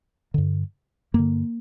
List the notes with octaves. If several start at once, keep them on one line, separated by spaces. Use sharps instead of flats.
G2 D3
G2 D3 A#3